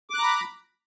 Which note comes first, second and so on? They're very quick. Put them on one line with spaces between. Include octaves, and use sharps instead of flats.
D6 F#6 A#5 B5